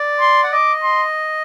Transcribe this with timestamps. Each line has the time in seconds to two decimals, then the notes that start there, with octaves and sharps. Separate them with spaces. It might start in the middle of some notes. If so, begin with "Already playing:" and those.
Already playing: D5
0.20 C6
0.43 F#5
0.52 D#5 D6
0.83 C6